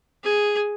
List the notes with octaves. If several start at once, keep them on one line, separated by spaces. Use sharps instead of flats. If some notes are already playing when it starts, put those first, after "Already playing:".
G#4